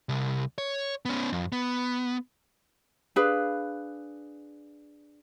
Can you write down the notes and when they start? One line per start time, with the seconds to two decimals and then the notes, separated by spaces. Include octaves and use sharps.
0.09 C2
0.58 C#5
1.05 B3 C#4
1.32 F2
1.52 B3
3.16 D4 G#4 B4 F5